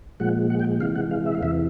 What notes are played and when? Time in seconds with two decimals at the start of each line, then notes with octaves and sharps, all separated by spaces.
0.20 A#2 F3 G#3 F#5
0.50 F#5
0.60 G5
0.80 C3 E3 G#3 F5
0.96 F#5
1.11 F5
1.26 E5
1.35 F5
1.41 E2 C3 E3 E5